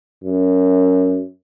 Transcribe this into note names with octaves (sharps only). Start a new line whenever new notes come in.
F#2